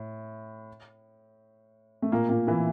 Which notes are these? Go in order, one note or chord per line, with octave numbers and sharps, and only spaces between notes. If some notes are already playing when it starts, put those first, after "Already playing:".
Already playing: A2
A3
A#2 A#3
A#2 A#3
E3 E4